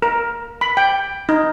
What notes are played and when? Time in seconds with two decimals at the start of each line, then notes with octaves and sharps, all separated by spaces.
0.02 A#4
0.61 B5
0.77 G5
1.29 D#4